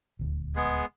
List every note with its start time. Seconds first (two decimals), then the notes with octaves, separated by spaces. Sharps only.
0.19 D#1 D2
0.56 G#3 B3 G#4